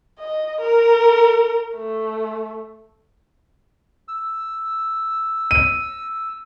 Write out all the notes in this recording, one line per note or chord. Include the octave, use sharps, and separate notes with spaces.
D#5
A#4
A3
E6
D#7